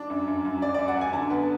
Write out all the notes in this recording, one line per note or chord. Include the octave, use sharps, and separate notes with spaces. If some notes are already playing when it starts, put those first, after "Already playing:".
Already playing: D4
F#2
F#2
F#2
F#2 D5
D5
F#2
F#5
F#2 G#5
D3 A5
B3